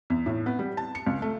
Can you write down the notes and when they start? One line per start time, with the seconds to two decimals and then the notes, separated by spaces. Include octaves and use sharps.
0.10 E2
0.26 A2
0.46 B3
0.59 G3
0.77 A5
0.95 C#7
1.07 C#2
1.22 A3